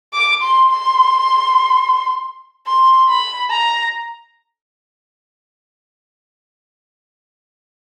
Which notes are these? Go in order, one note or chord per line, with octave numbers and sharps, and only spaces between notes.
D6
C6
C6
C6
B5
A#5